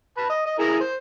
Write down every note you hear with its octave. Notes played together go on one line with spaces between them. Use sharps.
B4 A5
D#5
D#5
E4 G#4 A#4
C5